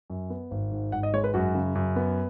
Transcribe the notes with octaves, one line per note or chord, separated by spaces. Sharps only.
F#2
B3
G#1
G#2
G#1 F#5
D#5
G#3 C#5
B4
F#2 F#4
C#3
F#2
B3